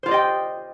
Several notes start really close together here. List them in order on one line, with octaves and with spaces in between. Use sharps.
C5 F4 D5 D#5 G5